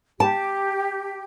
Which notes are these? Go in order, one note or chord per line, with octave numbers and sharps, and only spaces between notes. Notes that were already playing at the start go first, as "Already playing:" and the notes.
G4 A5